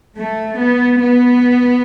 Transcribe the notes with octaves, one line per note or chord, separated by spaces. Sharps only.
A3
B3
B3